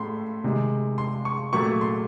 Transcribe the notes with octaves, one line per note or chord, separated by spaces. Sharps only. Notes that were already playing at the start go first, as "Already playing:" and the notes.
Already playing: A2 A3 B5 C6
C3 D#3 G#3
C6
C#6
A#2 F#3 A3 C#6
C6